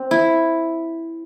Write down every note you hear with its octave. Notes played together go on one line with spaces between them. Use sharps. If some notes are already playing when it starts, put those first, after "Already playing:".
Already playing: C4
E4